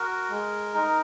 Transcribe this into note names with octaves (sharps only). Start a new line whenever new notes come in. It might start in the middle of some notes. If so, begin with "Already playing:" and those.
Already playing: F#4 A#4
G#3
D#4